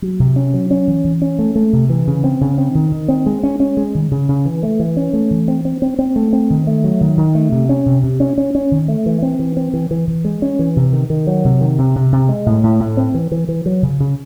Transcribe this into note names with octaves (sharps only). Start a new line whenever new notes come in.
F#3
C3
C#4
F#3
C#4
E3
E3
C#4
A3
A3
C3
E3
C#3
C4
C#3
C4
D#3
D#3
C4
G#3
C#4
C#4
G#3
D#3
C#3
C#3
E3
A3
E3
C#4
A3
E3
C4
C4
C4
C4
A3
C4
D#3
A3
F#3
D#3
D#3
A3
C3
C#4
C3
C3
C#4
C#4
C#4
D#3
A3
E3
C4
E3
C4
E3
E3
E3
G#3
C#4
E3
C3
D#3
D#3
F#3
C3
D#3
C3
C3
C3
G#3
A2
A2
A2
C4
E3
E3
E3
F#3
C#3
C#3